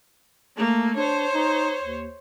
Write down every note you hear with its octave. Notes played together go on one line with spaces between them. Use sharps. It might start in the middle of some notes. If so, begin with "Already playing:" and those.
A3 A#3
D4 C5 C#5
D#4
D#2